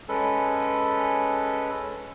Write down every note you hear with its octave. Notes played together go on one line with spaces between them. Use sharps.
G#3 C#4 A4 B4